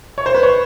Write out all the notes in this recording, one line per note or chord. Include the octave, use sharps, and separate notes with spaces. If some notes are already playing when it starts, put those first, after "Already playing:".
C#5
C5
B4
C#5